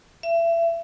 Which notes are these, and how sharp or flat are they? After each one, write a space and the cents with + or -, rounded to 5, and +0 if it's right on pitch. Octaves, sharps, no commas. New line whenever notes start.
E5 +30